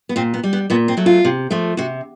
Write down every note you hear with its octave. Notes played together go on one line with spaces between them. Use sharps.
B3
A#2 C4
B3
G3
B3
A#2 B3
C4
F#3 A3
F4
C3
F3 A3
C3 F#4